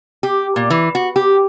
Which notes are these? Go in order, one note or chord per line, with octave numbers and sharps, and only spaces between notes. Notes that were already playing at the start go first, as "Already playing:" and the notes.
G4
A#2
E3
F#4
G4